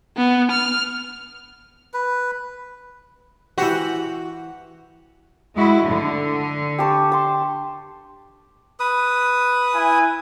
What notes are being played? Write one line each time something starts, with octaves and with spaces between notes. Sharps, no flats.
B3
F6
B4
E3 F#4 G4 C5
G#3 E4 F#4
D3
G4 A5 C#6
A5 C6
B4 D#6
E4 G#5